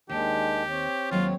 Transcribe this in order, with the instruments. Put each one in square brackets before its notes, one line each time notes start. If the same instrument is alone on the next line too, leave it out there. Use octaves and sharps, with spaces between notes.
[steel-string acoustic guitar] D#2 [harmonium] D#3 G#3 D4 [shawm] G4
[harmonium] C4 C#5
[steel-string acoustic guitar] D#2 F#3 G#3 [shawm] F4